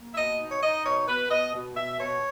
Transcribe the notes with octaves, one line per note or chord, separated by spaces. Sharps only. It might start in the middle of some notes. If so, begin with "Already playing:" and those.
Already playing: A#3
E5
B2 D#5
D#4
C#5
D#4 D#5
B2 C#5
B2 B4
B2 D#5
B2
B2 E5
B2 C#5